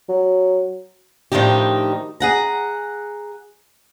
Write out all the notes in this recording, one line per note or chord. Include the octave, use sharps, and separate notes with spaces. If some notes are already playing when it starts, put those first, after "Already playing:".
F#3
A2 D#3 F3 D4 D#4 G4
G#4 F#5 A#5